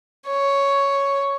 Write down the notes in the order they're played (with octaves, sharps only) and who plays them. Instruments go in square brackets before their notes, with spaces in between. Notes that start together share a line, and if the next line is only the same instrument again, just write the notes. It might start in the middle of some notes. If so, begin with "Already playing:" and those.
[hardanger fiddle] C#5